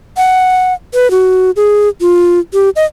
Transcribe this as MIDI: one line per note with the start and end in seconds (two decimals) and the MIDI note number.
0.17 0.73 78
0.94 1.10 71
1.11 1.51 66
1.56 1.89 68
2.01 2.39 65
2.54 2.70 67
2.76 2.85 75